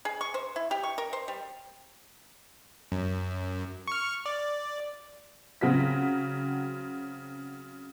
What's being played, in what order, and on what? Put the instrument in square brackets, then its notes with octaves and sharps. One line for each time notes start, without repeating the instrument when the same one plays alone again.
[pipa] G#4
C#6
C5
E4
G4
C#6
A#4
C5
G3
[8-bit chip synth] F#2
C#6 F6
D5
[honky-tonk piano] C#3 F#3 C4 F#4 B6